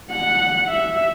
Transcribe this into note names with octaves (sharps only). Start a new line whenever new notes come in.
F#5
E5